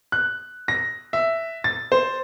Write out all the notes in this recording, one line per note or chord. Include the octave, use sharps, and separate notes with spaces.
F#6
A#6
E5
A6
C5